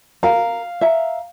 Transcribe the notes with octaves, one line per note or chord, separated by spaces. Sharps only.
A#4 F5
E5 A#5